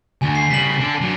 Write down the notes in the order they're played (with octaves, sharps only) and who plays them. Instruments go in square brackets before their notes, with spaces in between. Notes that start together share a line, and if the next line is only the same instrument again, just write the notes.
[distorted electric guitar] D2 [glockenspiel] G#5
[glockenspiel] C7
[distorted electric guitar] C#3 G3 [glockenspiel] B6 F#7
[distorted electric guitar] D4 A4
F#3 D4